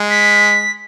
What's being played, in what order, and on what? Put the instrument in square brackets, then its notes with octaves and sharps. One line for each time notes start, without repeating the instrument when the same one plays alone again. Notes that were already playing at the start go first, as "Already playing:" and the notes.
Already playing: [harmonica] G#3
[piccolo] B6